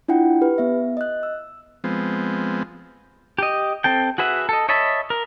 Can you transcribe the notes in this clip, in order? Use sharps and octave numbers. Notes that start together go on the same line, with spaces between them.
D4 E4 F4 F#5 G5
G4 B4
B3 E5
D#5 F#6
E6
F3 G#3 B3 C4
G4 D#5
C4 A4 G5
F#4 G#4 B4 E5 F#5
A4 D#5
C#5 D#5 E5 A5 B5
A#4